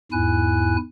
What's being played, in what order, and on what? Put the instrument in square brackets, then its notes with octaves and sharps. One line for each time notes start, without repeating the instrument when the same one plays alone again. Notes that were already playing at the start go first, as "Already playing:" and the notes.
[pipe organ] E2 G#2 E4 G#5 F#6